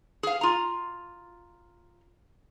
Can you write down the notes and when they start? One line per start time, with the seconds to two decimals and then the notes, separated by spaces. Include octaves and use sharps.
0.23 G#4 F5
0.41 F4 A#5